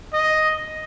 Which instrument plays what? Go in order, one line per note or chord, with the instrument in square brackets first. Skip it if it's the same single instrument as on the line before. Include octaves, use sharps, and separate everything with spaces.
[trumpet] D#5